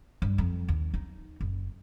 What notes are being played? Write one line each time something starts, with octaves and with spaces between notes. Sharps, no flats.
G2
F2
D#2
D#4
F#1